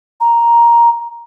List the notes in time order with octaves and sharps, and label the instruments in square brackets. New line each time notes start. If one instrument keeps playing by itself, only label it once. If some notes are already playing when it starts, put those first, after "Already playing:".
[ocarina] A#5